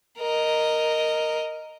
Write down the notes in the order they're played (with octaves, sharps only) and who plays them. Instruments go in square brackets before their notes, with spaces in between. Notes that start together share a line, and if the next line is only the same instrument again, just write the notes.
[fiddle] A#4 D#5